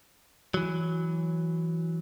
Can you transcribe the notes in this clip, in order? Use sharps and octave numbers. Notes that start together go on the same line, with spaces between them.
E3 F#3